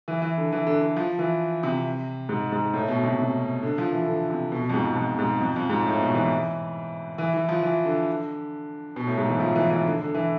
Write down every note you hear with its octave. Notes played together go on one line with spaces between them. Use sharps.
E3
E3
D3
E3
D3
D3
F3
E3
C3
G#2
G#2
A2
B2
C3
C3
D3
F3
E3
D3
C3
B2
F2
G#2
F2
G#2
F2
F2
G#2
A2
B2
E3
E3
E3
F3
E3
D3
B2
A2
G#2
E3
F3
E3
E3
D3
D3
E3